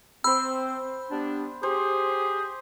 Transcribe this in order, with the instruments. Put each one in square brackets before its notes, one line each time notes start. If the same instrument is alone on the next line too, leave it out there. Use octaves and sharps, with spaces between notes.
[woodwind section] C4 [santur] C5 B5 [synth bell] E6
[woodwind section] G3 B3 D4
[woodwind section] G4 [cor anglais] G#4 [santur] C5